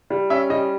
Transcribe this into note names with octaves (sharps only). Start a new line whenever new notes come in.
G3
C#4 E5
G3 D#5